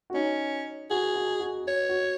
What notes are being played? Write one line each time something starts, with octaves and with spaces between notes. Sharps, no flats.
F#4
C#4 D#4
F#4 G#4
F#4
F#4
F#4 C#5
F#4